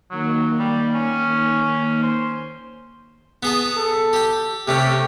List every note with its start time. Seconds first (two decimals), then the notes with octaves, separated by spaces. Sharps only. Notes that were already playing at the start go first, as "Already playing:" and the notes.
0.11 D#3 F#3 A#3
0.59 G3
0.95 C#4
2.03 C5
3.43 B3 G#4 A5
3.77 A4
4.13 G4 G5
4.68 C3 A3 C#4 G4